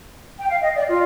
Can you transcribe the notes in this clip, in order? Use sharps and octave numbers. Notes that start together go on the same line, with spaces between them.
G5
F5
D#5
D5
F4